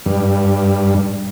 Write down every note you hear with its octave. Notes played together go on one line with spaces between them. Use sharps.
G2